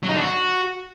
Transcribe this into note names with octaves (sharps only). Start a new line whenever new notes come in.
F#3
D#4
D3
F#4